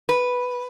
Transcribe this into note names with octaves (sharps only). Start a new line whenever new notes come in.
B4